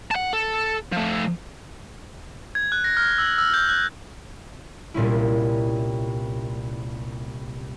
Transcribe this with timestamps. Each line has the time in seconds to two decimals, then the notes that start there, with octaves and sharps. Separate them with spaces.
0.11 F#5 A5
0.33 A4
0.92 F3 A3
2.55 G#6
2.72 F#6
2.84 A#6
2.97 F6
3.18 E6
3.38 E6
3.54 G6
3.69 F#6
4.94 C2 A#2 C#4 E4